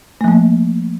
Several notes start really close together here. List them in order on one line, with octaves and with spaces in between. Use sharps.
A3 F3 A#3